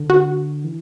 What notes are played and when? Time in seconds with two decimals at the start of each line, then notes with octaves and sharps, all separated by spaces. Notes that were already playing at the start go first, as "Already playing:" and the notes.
Already playing: D3
0.10 F#4
0.64 E3